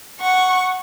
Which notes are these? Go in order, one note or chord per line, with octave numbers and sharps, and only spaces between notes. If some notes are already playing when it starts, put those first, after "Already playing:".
F#5 C#6